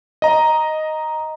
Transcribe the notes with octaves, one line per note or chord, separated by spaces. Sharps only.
D#5 A#5